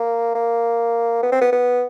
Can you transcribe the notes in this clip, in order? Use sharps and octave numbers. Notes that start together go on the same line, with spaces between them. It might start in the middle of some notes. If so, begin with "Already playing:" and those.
Already playing: A#3
A#3
B3
C4
B3
B3